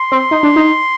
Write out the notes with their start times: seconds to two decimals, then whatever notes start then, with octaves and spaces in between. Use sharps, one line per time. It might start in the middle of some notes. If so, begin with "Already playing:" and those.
Already playing: C6
0.12 C4
0.31 D#4
0.43 D4
0.56 D#4